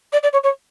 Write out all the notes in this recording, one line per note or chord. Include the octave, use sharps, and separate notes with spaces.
D5
D5
C#5
C#5